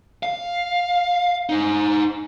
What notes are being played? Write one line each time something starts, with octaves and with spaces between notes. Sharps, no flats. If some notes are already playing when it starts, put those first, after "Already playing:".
F5
D#4 C5